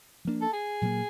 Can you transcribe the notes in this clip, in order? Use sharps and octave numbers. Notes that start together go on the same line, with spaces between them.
F3 A#3 D4
A4
G#4
A#2 F#3 A#3